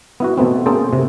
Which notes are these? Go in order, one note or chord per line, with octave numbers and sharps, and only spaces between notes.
B3 E4 F#4
B2 A3 B3 C4
A#3 C4 C#4 G#4 A4 C5
C3